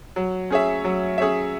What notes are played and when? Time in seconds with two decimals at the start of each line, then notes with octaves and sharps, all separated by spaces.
0.16 F#3
0.50 C#4 G#4 C#5 E5
0.84 F#3
1.18 C#4 G#4 C#5 E5